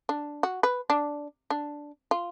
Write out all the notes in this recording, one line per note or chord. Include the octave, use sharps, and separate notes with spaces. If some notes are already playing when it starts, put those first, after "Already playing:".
D4
F#4
B4
D4
D4
F4